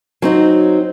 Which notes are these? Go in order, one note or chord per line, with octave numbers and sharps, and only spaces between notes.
F#3 C4 D#4